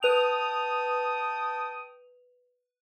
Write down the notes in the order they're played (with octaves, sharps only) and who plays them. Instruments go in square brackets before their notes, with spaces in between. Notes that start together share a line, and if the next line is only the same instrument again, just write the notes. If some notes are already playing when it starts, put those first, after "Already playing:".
[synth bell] B4 F7 [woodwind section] G5 A5 D#6